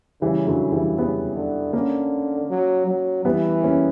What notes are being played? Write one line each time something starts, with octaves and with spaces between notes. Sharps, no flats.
C#3 E3 G3
D3 F#3
E3 G3
C#3 G3 B3
D3
D3 A#3 C#4
F#3
F#3
E3 G3 B3
A#3 C#4